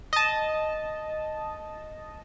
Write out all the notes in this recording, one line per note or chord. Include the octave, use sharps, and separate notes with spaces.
D#5 A5